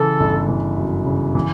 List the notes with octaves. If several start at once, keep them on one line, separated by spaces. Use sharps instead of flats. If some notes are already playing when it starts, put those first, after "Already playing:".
Already playing: C#3 E3 A4
G1
E3
F#2
C#3
E3